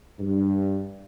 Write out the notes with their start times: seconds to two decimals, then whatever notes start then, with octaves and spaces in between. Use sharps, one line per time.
0.19 G2